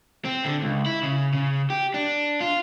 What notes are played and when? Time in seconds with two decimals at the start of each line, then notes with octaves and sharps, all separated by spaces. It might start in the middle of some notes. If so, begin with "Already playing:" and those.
0.25 C4
0.45 D3
0.62 C#2
0.86 E4
1.03 C#3
1.33 C#3
1.70 G4
1.94 D4
2.41 F4